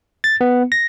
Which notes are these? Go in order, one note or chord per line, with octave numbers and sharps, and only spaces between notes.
A6
B3
A#6